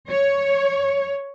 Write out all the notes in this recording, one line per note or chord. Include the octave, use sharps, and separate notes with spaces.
C#5